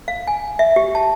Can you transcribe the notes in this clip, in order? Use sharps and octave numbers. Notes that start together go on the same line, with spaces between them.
F5
G#5
E5
G4
A5